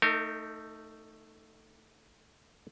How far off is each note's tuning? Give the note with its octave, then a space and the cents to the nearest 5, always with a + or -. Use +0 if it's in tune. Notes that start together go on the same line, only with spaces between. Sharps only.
A3 +10 D#4 +0 A#4 -35